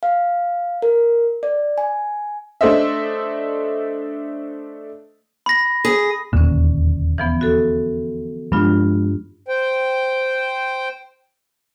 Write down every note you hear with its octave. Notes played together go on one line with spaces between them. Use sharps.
F5
A#4
D5
G#5
A3 D4 A4 C5 D#5 E5
B5 A#6
G#4
E1 D#2 A#2 D3 C#4
E3 F3 B3
F#4 A4
G2 F3 G#3 D4 F4
C5 G5